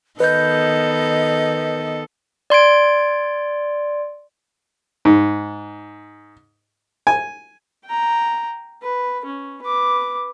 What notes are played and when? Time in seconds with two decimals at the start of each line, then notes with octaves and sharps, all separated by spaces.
0.20 D#3 B3 A4 B4 D#5 G6
2.50 D5 C6 G#6 D7
5.05 G#2
7.07 G#5
7.86 G5 A#5
8.82 B4
9.26 C#4
9.63 B4 D6